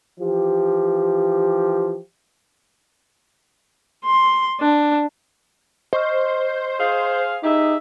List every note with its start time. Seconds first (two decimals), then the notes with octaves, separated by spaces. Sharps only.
0.20 E3 F3 G4
4.05 C6
4.60 D4
5.93 C5 D#5 C#6 F6
6.80 G#4 F5
7.43 D#4 G4 G#4 E5